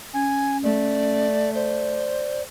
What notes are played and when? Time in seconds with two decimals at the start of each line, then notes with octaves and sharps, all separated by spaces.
0.14 C#4 G#5
0.63 A3 D5
1.55 C5 D5